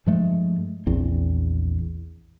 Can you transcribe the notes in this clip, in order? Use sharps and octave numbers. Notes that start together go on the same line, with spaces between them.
G2 F3 G#3 A3
A#1 E2 C4